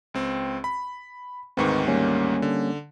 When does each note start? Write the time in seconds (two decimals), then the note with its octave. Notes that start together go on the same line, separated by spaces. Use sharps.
0.14 C#2 C4
0.64 B5
1.57 D2 G#2 D#3 C4 B4 C#6
1.88 G3 A#3 C#4
2.42 D3